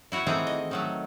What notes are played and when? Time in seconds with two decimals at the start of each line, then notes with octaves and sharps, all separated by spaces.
0.12 E4 F#4 C#5
0.26 D#3 E3 A3 C4 G#4 A#5
0.47 D#5
0.71 D#3 F#3 A3